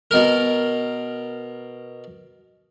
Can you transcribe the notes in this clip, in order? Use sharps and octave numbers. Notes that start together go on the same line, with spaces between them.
B2 A#4